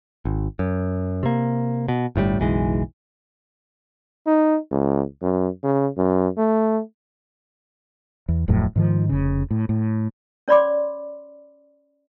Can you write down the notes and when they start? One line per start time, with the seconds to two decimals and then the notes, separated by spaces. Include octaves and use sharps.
0.25 G#1
0.59 F#2
1.23 C3 A#3
1.88 B2
2.16 G1 A2 C3 G3
2.39 F#1 B1 E3 G#3
4.27 D#4
4.71 C#2
5.22 F#2
5.64 C#3
5.98 F#2
6.38 A3
8.29 E2
8.48 D1 F2 A2 F#3
8.76 G#2 D#3 F3
9.09 F1 C#3
9.51 A2
9.69 A2
10.48 C#4 C#5 D5 B5 C6 D6